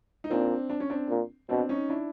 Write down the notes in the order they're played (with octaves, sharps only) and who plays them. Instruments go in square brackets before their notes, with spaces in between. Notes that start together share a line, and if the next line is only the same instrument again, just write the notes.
[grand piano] D#4
[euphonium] A#2 [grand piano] C4 D4
[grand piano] D4
C#4
C4 D4
[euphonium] A#2
[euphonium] B2 [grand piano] C4 D4
[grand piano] C#4 D#4
D4 E4